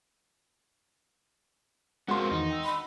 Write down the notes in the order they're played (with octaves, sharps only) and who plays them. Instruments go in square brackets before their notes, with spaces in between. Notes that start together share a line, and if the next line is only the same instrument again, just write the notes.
[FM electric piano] G#3 A#4 [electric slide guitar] B3 C4 F4 [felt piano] F#4 C6
[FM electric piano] E2 D#3 [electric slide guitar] D#4
[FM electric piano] G5 E6
[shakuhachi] B5